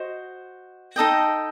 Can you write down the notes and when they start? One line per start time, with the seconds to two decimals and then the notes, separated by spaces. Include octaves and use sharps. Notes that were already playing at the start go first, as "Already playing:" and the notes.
Already playing: F#4 C5 D#5
0.96 D#4 A4 D#5 G5